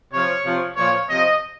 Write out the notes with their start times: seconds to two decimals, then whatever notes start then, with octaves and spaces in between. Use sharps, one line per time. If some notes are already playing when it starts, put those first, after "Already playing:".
0.12 C3 F3 C#5
0.44 C3 F3
0.76 A#2 F3 C#5
1.09 C3 F3 D#5